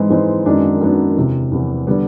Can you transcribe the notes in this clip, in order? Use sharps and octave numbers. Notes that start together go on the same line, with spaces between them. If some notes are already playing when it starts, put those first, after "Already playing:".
Already playing: G#2 E3 G#3 C4 E4
G#2 E3 G#3 C4 E4
F#2 D#3 G#3 B3 D4
F#2 D#3 G#3 B3 D4
E2 C3 E3
E2 C3 E3
D3 G3 B3